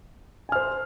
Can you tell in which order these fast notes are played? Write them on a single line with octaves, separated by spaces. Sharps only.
G#5 F6 C5